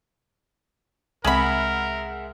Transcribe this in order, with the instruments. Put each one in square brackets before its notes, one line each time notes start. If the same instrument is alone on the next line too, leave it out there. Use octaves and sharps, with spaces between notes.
[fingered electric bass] C2 C4 [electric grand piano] G#3 E5 F#5 [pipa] G#4 B5 [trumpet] A#4